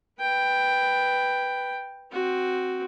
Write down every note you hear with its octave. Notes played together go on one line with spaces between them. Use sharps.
B4 G5
C4 F#4